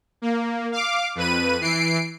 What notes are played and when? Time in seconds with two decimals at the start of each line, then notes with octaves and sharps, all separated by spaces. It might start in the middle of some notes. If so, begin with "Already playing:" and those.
0.22 A#3
0.72 F5 D6
1.15 F2 B4 D#7
1.61 E3 C7 D7